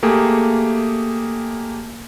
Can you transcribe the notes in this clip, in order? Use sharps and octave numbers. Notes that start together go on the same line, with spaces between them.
A3 A#3 G4 G#4